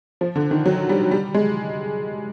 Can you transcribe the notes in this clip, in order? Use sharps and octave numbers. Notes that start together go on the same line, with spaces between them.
F3
D3
D#3
F#3
G3
G3
G#3